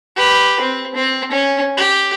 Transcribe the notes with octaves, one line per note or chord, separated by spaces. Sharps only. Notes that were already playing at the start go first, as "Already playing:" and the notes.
G4 B4
C4
C4
C#4
G4